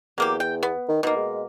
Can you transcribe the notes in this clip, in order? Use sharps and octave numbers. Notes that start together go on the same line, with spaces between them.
E2 F#3 A#3 G4
G5
B3
D#3
B2 A#3 D#4
G#3